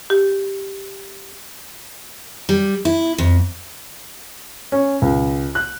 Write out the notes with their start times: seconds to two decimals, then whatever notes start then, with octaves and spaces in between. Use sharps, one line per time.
0.10 G4
2.49 G3
2.85 E4
3.18 F2
4.72 C#4
5.02 C#2
5.55 F#6